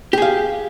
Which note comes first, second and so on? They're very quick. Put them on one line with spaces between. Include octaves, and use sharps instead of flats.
G4 G#4 F5